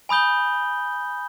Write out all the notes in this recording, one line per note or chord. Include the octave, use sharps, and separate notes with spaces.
G#5 B5 D#6 G6 G7